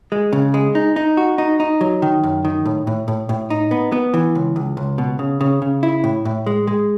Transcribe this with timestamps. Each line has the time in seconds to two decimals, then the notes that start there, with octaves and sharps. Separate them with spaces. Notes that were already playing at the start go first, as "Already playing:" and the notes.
0.12 G#3
0.33 C#3
0.54 G#3
0.75 D#4
0.96 D#4
1.17 F#4
1.38 D#4
1.60 D#4
1.81 F#3
2.02 D#3
2.23 F#2
2.45 D#3
2.66 A2
2.87 A2
3.08 A2
3.29 A2
3.50 D#4
3.71 B3
3.92 B3
4.14 E3
4.35 C#2
4.56 C#2
4.77 C#2
4.98 B2
5.19 C#3
5.41 C#3
5.62 C#3
5.83 E4
6.04 A2
6.25 A2
6.47 G#3
6.67 G#3